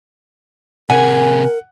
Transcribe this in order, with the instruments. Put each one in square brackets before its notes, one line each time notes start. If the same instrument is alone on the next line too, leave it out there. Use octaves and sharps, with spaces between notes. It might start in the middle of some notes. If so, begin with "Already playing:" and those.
[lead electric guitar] C3 G#4 [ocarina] A#4 [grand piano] F#5 [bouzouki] G#5